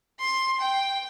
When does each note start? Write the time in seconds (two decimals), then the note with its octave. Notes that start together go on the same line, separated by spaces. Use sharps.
0.20 C6
0.60 G5